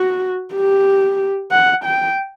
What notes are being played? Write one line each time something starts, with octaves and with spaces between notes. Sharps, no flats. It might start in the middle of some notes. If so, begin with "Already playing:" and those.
Already playing: F#4
G4
F#5
G5